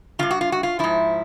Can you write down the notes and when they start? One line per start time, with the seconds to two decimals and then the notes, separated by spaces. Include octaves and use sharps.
0.19 G2 D#3 F4
0.31 F#4
0.41 F4
0.52 F#4
0.63 F4
0.79 G#2 F3 E4